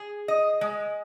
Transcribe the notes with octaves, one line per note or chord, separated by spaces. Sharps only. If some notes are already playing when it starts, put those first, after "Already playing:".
Already playing: G#4
D#5
G#3